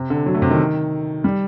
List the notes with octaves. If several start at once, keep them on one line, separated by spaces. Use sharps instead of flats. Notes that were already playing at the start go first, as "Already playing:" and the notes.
Already playing: C3
D3
F#3
A3
C3
D#3
G3